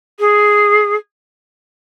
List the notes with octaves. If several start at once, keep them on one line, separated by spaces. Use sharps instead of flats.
G#4